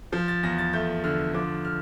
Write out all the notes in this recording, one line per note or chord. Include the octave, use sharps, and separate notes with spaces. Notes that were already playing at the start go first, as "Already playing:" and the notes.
F3 G6
A6
E2 A#6
A6
A3 G6
D3 F6
F3 D6
F6